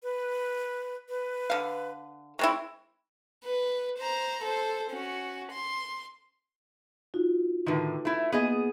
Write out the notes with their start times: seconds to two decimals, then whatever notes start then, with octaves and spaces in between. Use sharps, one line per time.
0.03 B4
1.09 B4
1.50 D3 F5
2.39 G#3 C4 E4 C#6
3.45 B4
3.98 C5 A#5
4.43 A4 C5
4.91 C#4 F#4
5.52 C6
7.14 D#4 F4 F#4
7.66 A2 D3 D#3 D#4 B4 A5
8.05 A3 E4
8.32 A#3 B3 G#4 D#5 G#5